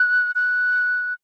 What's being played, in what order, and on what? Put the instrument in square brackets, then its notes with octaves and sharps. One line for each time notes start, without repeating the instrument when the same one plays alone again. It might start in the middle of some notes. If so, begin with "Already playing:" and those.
Already playing: [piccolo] F#6
F#6